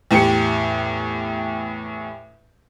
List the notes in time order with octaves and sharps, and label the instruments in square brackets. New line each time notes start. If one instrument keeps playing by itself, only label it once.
[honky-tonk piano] E2 A2 G4 C#7